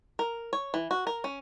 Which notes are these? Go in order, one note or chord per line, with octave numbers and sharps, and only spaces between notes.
A#4
C#5
E3
F#4
A#4
C#4